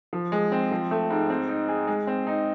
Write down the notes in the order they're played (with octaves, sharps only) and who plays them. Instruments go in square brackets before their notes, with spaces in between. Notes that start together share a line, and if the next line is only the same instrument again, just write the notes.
[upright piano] F3
G#3
C4
F3
A3
G#2
C4
D#4
G#4
G#3
C4
D#4